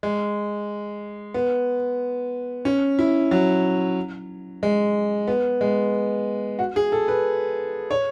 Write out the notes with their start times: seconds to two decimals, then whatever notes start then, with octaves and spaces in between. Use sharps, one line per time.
0.03 G#3
1.34 B3
2.65 C#4
2.99 E4
3.31 F#3
4.63 G#3
5.28 B3
5.61 G#3
6.59 F#4
6.76 G#4
6.92 A4
7.08 B4
7.91 C#5